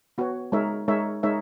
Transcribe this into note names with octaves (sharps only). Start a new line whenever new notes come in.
B3 F#4 C#5
G#3 D#4 A#4 C#5 E5
G#3 D#4 A#4 C#5 E5
G#3 D#4 A#4 C#5 E5